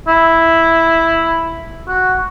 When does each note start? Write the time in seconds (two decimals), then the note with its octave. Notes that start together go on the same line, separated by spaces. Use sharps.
0.08 E4
1.88 F#4